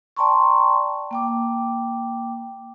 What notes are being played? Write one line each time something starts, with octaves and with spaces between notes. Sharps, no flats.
D5 G5 A5 A#5 C6 C#6
A#3 G5 D6